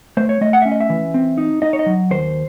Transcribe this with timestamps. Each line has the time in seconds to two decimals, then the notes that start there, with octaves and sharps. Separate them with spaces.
0.17 A3 C5
0.29 C#5
0.41 A3 D#5
0.53 F#5
0.62 C#4 E5
0.72 D#5
0.81 E5
0.90 E3
1.14 C4
1.38 D#4
1.62 D#4 D#5
1.73 C#5
1.79 D#5
1.86 F#3
2.11 D#2 C5